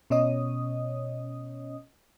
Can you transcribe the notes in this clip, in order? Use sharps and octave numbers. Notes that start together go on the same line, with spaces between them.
B2 C#4 C#5 D#5 D#6